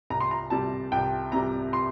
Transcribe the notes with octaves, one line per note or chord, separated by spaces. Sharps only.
C2 A#5
C6
A#5
C3 G3 A5
C2 G5
C3 G3 A#5
C6